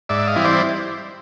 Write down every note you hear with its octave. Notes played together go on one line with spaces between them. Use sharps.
G#2 D5 E5
D#5 F5
E3 G3 C4 E4
C5 D5